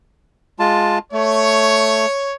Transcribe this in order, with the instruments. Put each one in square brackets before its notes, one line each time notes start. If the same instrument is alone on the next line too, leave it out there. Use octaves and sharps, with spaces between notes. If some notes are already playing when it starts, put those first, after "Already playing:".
[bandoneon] G#3 F4 A5
[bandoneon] A3 [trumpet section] C#5